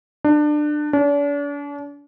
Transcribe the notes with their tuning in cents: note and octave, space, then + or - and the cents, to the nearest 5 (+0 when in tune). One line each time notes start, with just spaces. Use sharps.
D4 +25
D4 -40